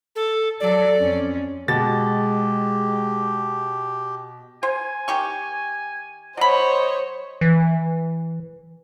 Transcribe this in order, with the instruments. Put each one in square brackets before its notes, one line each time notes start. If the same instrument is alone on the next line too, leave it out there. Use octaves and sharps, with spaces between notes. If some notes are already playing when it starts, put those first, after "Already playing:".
[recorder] A4
[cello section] F#3 A4 [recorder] D5
[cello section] F2 C#4
[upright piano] B2 A6 [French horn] G#3 [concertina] G4
[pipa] C5 [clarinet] G#5
[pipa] D#3 G4 C#6
[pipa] F#3 B5 [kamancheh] C5 C#5 [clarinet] D#5
[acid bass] E3